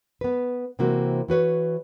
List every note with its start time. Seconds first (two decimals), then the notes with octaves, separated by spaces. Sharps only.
0.21 B3 B4
0.79 C3 E3 A#3 C4 F#4
1.28 E3 F#4 B4 C#5